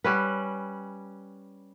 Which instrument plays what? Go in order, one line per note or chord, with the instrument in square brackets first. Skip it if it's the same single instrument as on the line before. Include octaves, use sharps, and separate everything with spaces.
[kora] G3 C#4 B4